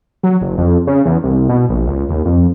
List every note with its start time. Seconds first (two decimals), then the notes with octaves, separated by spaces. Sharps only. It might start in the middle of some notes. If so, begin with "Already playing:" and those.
0.23 F#3
0.41 F#1
0.58 F2
0.87 C#3
1.06 E2
1.24 C2
1.49 B2
1.69 A#1
1.87 C#2
2.09 D#2
2.25 F2